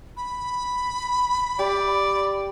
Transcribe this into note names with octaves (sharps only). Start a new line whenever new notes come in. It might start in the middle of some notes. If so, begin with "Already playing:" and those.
B5
G4 D5